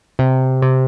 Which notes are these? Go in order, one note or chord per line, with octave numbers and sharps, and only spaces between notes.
C3
C3